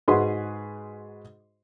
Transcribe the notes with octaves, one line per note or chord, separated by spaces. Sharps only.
G#2 F#4 G#4 B4 C6